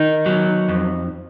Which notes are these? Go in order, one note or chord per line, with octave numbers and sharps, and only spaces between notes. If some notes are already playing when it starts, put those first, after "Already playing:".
Already playing: D#3 D#4
F#3
F2